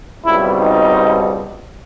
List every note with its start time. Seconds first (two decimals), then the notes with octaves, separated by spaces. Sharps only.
0.24 C#2 B2 G3 C4 E4
0.61 D#4